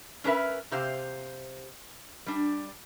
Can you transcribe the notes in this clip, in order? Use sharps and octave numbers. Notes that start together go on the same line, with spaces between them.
C#4 D4 A#4 B4 E5
C3 G4 C5 F5
G3 D4